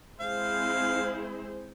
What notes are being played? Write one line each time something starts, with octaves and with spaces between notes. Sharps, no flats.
G#3 C4 E4 G#4 C5 F5